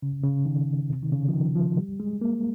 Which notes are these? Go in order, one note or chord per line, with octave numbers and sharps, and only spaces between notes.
C#3
C#3
D#3
C3
D#3
C#3
F3
D#3
F3
G3
G#3
A#3